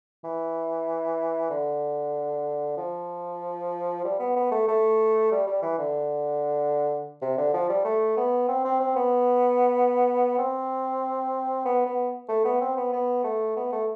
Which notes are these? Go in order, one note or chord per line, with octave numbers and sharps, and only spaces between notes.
E3
D3
F3
G3
B3
B3
A3
A3
G3
G3
E3
D3
C3
D3
F3
G3
A3
B3
C4
C4
C4
B3
C4
B3
B3
A3
B3
C4
B3
B3
A3
B3
A3